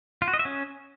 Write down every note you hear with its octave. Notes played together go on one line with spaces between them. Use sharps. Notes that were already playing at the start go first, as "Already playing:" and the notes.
F4
F#4
D#5
E5
C#4